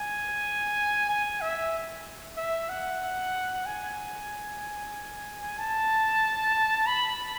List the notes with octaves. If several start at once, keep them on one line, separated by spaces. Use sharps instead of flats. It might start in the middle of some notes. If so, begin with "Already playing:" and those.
Already playing: G#5
G#5
E5
E5
F#5
G#5
A5
B5